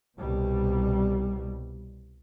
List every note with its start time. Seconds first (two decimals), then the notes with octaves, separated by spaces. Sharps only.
0.18 C2 B2 G3